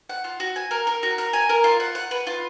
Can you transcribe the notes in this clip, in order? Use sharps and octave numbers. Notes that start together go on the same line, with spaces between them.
F#5
F4
F#4
G#5
A#4
A#4
F#4
A#4
G#5
A#4
F4
F#5
F#5
B4
F4